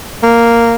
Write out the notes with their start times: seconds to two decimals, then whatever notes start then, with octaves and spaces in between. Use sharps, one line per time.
0.23 A#3